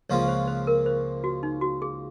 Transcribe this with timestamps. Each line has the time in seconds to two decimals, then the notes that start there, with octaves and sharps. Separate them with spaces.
0.10 C#2 C#3 F3 A#3 F4 C#5
0.28 C5
0.48 C5
0.67 A#4
0.86 C5
1.24 F#4
1.43 D#4
1.61 F#4
1.82 G#4